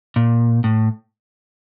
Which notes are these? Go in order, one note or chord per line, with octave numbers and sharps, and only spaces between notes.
A#2
A2